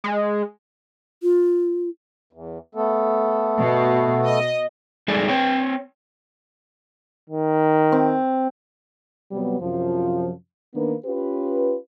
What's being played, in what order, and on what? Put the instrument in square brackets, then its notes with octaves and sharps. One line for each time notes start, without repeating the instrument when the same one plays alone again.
[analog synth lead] G#3
[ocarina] F4
[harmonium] E2
A3 B3 A4
[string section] B2
D#5
[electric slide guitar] G3 G#3 D#4 G#4 A4 D5
C4 C#5 G5
[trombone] D#3
[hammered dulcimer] C4
[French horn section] C3 F#3 G3 B3
F#2 C3 F3
D#3 A#3 B3 D4 B4
C#4 F4 G4 B4